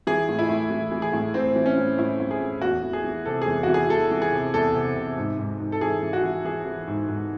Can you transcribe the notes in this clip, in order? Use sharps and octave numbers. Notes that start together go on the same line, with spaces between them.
E3 G#4
A2
E4
A2
E3
E3
G#4
A2
A2 C4
E3
C#4
A2
A2 E4
A2
G#4
A2
E2 F#4
E3
G#4
E3
C3 A4
G#4
E2
E3 F#4
G#4
E3 A4
E3
G#4
C3
E2 A4
C3
C3
G#2
G#2
G#2
A4
E3 G#4
E3
F#4
E3
E3 G#4
E3
G#2
G#2